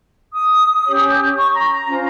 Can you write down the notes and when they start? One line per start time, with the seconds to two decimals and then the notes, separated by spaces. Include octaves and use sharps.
0.33 D#6
0.85 C#4 G4 C#5
1.36 C#6
1.53 A#5
1.71 A#5
1.87 C#4 F4 C5